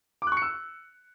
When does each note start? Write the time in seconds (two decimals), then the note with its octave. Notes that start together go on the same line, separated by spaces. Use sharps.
0.22 D6
0.27 F#6
0.32 C#6
0.37 C#7
0.42 E6